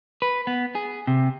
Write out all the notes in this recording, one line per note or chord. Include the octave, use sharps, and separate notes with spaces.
B4
B3
G#4
C3